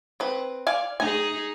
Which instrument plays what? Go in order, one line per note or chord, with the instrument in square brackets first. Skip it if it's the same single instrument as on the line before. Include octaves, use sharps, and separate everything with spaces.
[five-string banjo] C4 B4
D5 F5 G#5
[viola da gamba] D#4 G#4 [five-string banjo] G#5